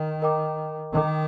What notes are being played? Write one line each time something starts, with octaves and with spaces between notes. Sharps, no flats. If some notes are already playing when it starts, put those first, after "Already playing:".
Already playing: D#3 A#4 D#5 G5
A#4 D#5 G5 A#5 D6
D#3 A#4 D#5 G5 A#5 D6